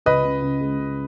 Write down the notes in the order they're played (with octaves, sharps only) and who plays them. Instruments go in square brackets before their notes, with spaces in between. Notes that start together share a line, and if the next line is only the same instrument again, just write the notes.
[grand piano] C#2 [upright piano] B4 D#5
[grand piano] C#3
C#3
G#3
C#3